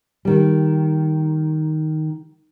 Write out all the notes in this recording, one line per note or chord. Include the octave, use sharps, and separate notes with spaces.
D#3 G3